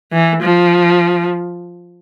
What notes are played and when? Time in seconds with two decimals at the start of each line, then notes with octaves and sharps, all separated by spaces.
0.12 E3
0.42 F3